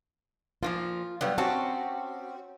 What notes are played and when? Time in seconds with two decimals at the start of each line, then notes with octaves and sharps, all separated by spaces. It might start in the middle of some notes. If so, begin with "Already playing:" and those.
0.63 A#2 E3 F3 F4
1.21 G2 F#3 G3 B3
1.38 C4 C#4 F#4 G4 A5